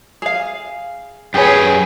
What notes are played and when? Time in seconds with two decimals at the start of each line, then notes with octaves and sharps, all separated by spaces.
0.22 G#4 F5
1.34 F#2 G4 G#4 B4 C#5